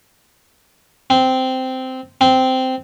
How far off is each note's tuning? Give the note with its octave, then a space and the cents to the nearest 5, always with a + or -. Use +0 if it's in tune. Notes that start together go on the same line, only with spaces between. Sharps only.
C4 -10
C4 -10